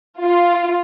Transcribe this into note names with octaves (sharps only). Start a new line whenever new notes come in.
F4